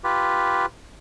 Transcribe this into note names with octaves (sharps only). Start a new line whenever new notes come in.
F4 G4 B4